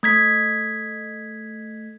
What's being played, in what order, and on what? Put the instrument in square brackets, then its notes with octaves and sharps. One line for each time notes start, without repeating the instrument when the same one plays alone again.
[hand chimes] A3 G#6 B6